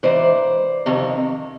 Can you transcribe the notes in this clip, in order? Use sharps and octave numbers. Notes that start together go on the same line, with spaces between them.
G#2 E3 C5 D5
F2 C3 D#3